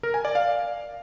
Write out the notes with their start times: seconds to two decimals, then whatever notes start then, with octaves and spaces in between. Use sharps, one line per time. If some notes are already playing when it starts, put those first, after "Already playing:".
0.03 A#4
0.14 G#5
0.25 D5
0.35 F5